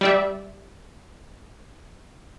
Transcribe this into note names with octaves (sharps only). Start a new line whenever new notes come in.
G3 D5 E5